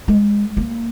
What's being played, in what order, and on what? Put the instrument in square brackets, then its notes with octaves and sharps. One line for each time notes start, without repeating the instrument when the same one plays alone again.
[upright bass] G#3
A#3